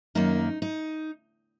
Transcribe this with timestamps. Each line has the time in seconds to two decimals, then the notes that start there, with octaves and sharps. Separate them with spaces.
0.15 F#2 D#3 A#3 D#4
0.62 D#4